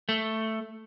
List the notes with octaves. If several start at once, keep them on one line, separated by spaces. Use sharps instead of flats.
A3